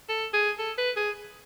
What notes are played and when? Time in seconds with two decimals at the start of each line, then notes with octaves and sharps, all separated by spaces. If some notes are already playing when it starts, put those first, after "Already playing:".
0.09 A4
0.33 G#4
0.58 A4
0.78 B4
0.96 G#4